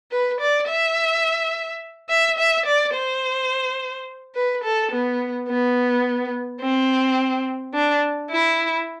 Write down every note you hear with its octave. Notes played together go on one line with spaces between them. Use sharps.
B4
D5
E5
E5
E5
D5
C5
B4
A4
B3
B3
C4
D4
E4